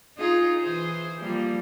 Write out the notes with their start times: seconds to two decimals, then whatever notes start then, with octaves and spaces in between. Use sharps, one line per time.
0.17 D#4 F4 G#4
0.61 E3 G#4 C5
1.20 F3 G3 A#3